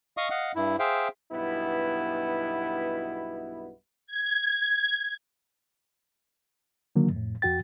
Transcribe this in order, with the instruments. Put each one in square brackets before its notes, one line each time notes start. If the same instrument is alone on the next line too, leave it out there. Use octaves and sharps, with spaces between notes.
[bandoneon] D#5 F5 C#6 D#6
D#5 F5 F#5
G2 E4
G#4 C5 E5 F5 G5
[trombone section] B1 G2 B2 B3 E4
[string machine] G#6
[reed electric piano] D3 D#3 F#3 A#3
F2 A2
F2 F#4 G5 A6